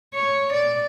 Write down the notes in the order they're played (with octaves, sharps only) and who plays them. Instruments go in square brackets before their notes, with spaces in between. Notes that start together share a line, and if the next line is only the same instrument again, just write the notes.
[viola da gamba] C#5
D5